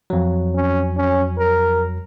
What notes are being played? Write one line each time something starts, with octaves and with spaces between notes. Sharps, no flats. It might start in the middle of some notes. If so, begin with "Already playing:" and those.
F2 F#3
C#4
C#4
A#4